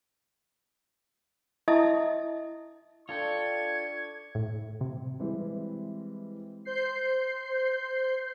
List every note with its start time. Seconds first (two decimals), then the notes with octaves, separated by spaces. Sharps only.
1.68 E4 D#5 E5 A5 D#6
3.09 D4 F4 A4 G5 C#6 G#6
4.35 A2
4.81 C3
5.19 E3 G3 G#3 C4 E4
6.65 C5 G6 C7